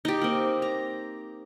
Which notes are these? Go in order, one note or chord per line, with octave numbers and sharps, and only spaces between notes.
D#4 G4
A#3 C4
A#5